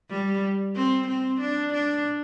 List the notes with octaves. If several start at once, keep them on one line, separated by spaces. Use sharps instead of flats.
G3
C4
C4
D4
D4